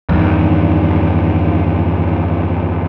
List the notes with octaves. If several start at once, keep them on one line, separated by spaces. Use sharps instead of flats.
E2 G2 D#3